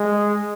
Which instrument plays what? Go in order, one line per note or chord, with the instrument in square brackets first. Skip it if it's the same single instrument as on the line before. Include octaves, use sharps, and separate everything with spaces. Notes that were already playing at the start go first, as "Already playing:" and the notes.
Already playing: [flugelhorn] G#3